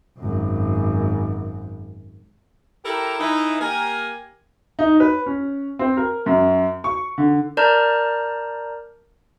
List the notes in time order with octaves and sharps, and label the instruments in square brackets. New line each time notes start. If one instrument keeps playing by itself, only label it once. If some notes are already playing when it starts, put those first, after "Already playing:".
[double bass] G#1 F#2
[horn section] E4 G4 A4 A#4 A#5
E3 D#4 E4
A#3 G4 A#4 G#5
[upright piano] D#4
B4
C#4
C4
A#4
F#2
C#6
D3
[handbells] A#4 D5 A5 A#5 F6 G6